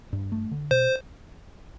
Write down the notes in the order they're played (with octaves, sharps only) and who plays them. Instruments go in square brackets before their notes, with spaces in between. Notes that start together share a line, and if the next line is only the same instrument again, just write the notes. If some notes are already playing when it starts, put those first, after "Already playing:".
[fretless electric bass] G2
A3
D3
[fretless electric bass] B2 [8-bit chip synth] C5